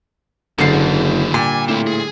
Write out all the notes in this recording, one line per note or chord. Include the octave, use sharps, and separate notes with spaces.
F#1 D#2 G#2 D3 E3 A5 C7
A#2 G3 G#5
A2 C4 E4
G#4